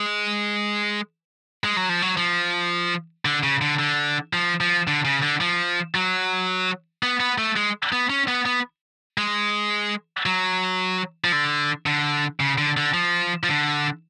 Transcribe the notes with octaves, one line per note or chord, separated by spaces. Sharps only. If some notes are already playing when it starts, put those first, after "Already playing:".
Already playing: G#3
G#3
F#3
F3
F#3
F3
D3
C#3
D3
D3
F3
F3
D3
C#3
D3
F3
F#3
B3
B3
A3
G#3
B3
C#4
B3
B3
G#3
F#3
F3
D3
D3
C#3
D3
D3
F3
F3
D3